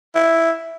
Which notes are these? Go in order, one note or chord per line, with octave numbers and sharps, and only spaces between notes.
E4